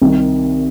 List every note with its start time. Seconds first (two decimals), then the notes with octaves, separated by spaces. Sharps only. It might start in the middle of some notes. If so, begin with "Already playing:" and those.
0.01 C2 C3 D#3